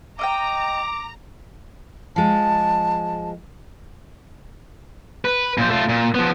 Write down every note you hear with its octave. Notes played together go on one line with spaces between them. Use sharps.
D#5 F5 G5 A#5 D6
F3 G#3 A5
B4
A#2 C5
A3 F4
A#2
F3 B3